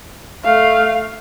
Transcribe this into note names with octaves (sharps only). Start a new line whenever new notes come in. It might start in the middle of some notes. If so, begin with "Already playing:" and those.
A3 F5